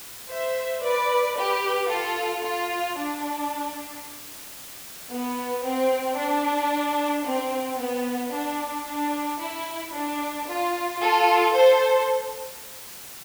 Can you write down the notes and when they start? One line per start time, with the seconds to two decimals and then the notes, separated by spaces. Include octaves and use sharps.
0.29 C5 E5
0.82 B4 D5
1.36 G4 B4
1.89 F4 A4
2.43 F4
2.97 D4
5.12 B3
5.65 C4
6.19 D4
7.26 C4
7.80 B3
8.34 D4
8.87 D4
9.41 E4
9.94 D4
10.49 F4
11.02 F4 A4
11.56 A4 C5